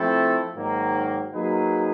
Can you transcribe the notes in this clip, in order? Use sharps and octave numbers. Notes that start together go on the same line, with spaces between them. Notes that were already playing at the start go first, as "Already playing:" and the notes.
Already playing: F3 A3 C4 E4 A4
G#2 D#3 F#3 A#3
F#3 A#3 D#4 G#4 B4